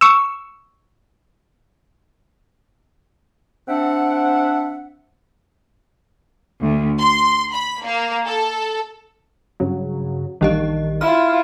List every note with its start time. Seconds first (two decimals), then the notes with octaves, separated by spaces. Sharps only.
0.01 C#6 E6
3.68 C4 D4 E5 F#5
6.62 D2
6.99 C6
7.53 B5
7.83 A#3
8.26 A4
9.60 G2 C#3 F#3
10.41 A#1 D#3 E3 G3 G4 D#5
11.01 E4 F4 F6